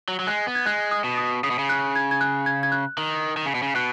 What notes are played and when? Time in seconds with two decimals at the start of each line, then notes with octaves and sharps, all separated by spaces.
0.08 F#3
0.19 F#3
0.27 G#3 F#6
0.47 B3
0.55 G#6
0.66 G#3 F#6
0.91 D#6
1.04 B2
1.18 D#6
1.44 C#3 D#6
1.51 B2
1.59 C#3
1.69 F#6
1.96 G#6
2.11 G#6
2.21 F#6
2.46 G#6
2.63 G#6
2.72 F#6
2.98 D#3
3.37 D#3
3.46 C#3
3.55 B2
3.62 C#3
3.75 B2 F#6